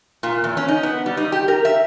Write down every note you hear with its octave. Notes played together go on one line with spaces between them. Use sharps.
A#2
E2
C#4
D#4
B3
G3
D#4
G4
A#4
E5